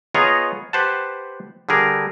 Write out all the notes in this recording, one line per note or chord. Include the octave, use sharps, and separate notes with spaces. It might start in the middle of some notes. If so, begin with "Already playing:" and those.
B3 F4 G#4 C#5 D#5 A#5
G4 B4 C5 F#5 A5
D3 G3 G#4 A#4